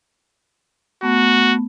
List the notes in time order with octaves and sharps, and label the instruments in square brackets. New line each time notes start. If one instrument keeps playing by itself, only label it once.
[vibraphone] A3 B3 [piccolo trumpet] F#4